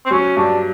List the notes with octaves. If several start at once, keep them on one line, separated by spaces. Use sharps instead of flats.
C4
F#3 C#4
G2 D4